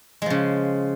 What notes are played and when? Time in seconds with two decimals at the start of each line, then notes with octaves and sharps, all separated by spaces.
0.22 G#3
0.26 F3
0.30 C#3